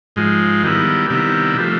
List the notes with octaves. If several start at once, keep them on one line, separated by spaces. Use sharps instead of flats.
G#2 F3 G#3
D#3 G3 B3 E4
C3 D#3 G3 B3 E4
C3 F3 A3